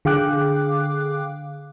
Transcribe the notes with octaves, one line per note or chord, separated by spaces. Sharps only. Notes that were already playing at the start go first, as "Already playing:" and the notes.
D3 G#4 F5 G5 D6 F#6